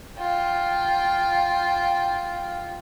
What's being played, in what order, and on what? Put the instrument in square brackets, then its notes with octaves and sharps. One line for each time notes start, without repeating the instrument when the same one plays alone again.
[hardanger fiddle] F4 G5